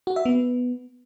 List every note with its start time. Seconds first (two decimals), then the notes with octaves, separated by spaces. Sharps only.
0.07 F#4
0.16 E5
0.25 B3